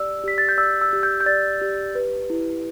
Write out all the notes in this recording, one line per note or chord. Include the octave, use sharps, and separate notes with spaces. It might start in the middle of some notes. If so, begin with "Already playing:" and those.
Already playing: G4 D5 E6
G4 B6
A6
G6
D5 E6
E6
G4
G6
G6
D5 A6
G4
B4
E4